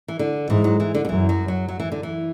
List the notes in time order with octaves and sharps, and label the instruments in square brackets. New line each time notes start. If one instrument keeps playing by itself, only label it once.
[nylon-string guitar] E3
D3
[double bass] G#2 [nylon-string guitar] E3
[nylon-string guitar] F#3
E3
D3
D3
[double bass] F#2 [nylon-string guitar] E3
[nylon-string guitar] F#3
F#3
F#3
E3
D3
E3